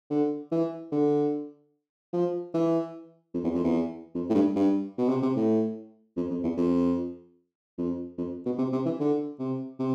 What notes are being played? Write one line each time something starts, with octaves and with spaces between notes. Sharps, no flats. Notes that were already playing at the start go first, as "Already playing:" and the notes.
D3
E3
D3
F3
E3
F2
E2
F2
E2
F2
A2
G2
G2
B2
C3
C3
A2
F2
F2
E2
F2
F2
F2
B2
C3
C3
E3
D3
C3
C3